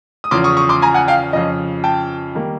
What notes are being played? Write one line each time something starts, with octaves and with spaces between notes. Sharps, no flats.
D#6
E2 C#3 F3 C6 D6
C#6 D#6
C#6 D#6
C6 D6
G#5 A#5
F#5 G#5
F5 G5
F2 C#3 F3 D#5
G5 A5
D#3 G3 A#3